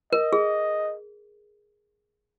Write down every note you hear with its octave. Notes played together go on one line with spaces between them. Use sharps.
A#4 D#5
G#4